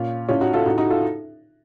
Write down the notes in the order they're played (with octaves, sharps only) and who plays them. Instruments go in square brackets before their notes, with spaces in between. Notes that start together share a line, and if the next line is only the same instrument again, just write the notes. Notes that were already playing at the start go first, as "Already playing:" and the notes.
Already playing: [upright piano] A#2 C#4 F4
A2 C#4 F4
D#4 F#4
F4 A4
A2 D#4 F#4
D#4 F#4
F4 A4